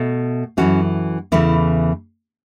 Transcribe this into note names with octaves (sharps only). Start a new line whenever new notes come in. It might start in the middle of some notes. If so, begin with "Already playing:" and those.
Already playing: B2 A3
F#2 E3 A3 C#4 F#4
E2 C#3 E3 A3 E4